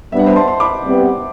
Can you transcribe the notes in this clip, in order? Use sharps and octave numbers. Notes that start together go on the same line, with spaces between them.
G3 B3 D4 E5
F#5
C5 E5
A5 C6
C6
B5 D6
C3 G3 B3